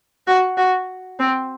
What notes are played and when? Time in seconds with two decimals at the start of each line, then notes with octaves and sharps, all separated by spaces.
0.27 F#4
0.57 F#4
1.20 C4